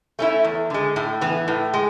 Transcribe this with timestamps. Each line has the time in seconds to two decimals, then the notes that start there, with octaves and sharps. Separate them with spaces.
0.19 A3 C#4 E4
0.44 E2
0.70 D3 G#3
0.96 A2
1.21 E3 B3
1.48 A2
1.74 G#3